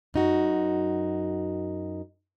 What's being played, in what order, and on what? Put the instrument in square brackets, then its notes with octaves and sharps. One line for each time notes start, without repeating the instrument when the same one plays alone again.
[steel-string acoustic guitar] F#2 D#4 F#4